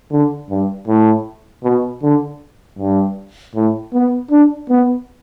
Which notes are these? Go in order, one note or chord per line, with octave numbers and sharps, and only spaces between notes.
D3
G2
A2
B2
D3
G2
A2
B3
D4
B3